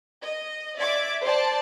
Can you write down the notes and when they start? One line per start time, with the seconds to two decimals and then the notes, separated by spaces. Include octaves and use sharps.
0.23 D#5
0.77 D5 E5 D6 G#6
1.22 C5 D5 A5